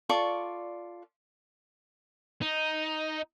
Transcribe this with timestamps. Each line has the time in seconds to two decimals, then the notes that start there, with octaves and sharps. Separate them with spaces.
0.09 F4 A4 D5 C#6
2.42 D#4